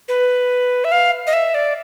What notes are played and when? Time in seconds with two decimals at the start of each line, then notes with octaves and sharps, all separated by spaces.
0.08 B4
0.84 E5
0.92 F5
1.27 D#5
1.33 E5
1.54 D5